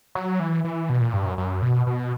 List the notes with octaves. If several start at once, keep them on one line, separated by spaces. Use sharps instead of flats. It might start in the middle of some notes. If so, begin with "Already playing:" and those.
F#3
E3
E3
B2
A#2
G2
F#2
F#2
B2
B2